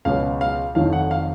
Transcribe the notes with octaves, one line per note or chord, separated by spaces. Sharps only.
C#2 B2 F#3 F5
F5
F1 F2 D#3 F#3 F5
F#5
F5